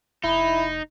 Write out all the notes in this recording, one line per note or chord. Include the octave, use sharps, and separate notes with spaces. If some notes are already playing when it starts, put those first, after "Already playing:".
F1 D#4 E4